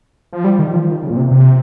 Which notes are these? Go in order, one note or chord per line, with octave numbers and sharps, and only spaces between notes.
F3
G3
D#3
F3
D#3
C#3
A#2
C3
C3